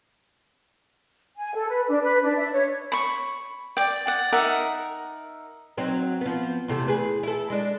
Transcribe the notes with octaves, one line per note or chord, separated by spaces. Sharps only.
G#5
A4
B4
D4
B4
D4
E5
C#5
B5 C#6
D5 G5
D5 F#5
D#4 A#4 E5 F#5
F#3 C4 D#4
F3 B3
E2 C3 A3
G#4 B4
E4 A4
G#3 D4